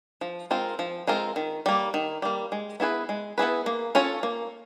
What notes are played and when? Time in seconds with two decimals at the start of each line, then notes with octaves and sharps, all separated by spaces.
0.21 F3
0.51 G#3 C4 F4 A#4
0.79 F3
1.07 G#3 C4 F4 A#4
1.36 D#3
1.66 G3 A#3
1.94 D#3
2.22 G3 A#3
2.52 G#3
2.80 B3 E4 G#4 B4
3.09 G#3
3.38 B3 E4 G#4 B4
3.66 A#3
3.95 C#4 F4 A4 C#5
4.23 A#3